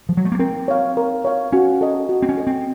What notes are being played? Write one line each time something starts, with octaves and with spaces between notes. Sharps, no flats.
F3
F#3
A3
A#3
C4 A#4
C#5 F5
A#4
C#5 F5
C#4 F#4
A4 D#5
F#4
C4
C#4
A4 D#5
C4